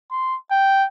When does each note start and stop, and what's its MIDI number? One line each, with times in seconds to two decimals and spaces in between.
0.11 0.36 84
0.51 0.86 79